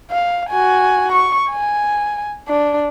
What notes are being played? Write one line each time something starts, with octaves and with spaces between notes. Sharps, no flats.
F5
F#4 G#5
C#6
G#5
D4